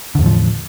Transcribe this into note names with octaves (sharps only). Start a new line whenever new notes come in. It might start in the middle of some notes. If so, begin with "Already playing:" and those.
E2 A2 D3 F3